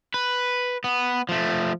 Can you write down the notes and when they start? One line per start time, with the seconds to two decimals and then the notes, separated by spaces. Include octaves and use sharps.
0.14 B4
0.84 B3
1.29 F3 A3